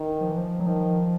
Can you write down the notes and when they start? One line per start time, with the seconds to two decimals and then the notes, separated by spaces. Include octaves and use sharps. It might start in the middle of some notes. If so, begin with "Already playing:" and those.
Already playing: D#3
0.21 F3
0.29 E3
0.37 F3
0.60 F#3
0.66 D#3 F3